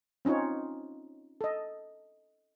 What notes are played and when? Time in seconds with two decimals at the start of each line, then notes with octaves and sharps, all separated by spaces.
0.25 C4 C#4 D#4 F4 C#5
1.41 A4 D#5